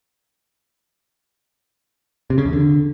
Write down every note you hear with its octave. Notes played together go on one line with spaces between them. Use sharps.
C3
C#3
E2
D3